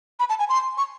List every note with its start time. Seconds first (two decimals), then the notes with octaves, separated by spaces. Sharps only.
0.20 B5
0.30 A5
0.39 G#5
0.49 C6
0.78 C#6